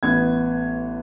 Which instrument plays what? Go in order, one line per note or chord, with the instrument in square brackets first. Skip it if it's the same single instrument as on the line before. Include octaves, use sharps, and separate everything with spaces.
[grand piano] A1 B3 G#6